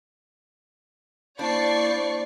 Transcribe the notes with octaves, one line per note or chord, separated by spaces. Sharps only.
A#3 D4 E4 C5 D5 C#6 C7